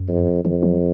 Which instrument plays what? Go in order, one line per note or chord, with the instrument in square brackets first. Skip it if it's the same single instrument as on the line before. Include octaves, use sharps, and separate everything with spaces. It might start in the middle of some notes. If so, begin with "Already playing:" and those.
Already playing: [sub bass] F#2
[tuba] F2
[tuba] F2 [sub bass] D#3
[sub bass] F3
F#3